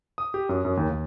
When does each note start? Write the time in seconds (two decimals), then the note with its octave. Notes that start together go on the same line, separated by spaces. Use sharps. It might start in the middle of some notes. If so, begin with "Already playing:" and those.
0.18 D#6
0.34 G4
0.49 F#2
0.65 F#2
0.77 D#2
0.90 D#2